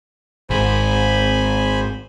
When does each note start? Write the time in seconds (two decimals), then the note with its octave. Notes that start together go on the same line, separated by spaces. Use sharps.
0.50 G#1 C5 G#5 B5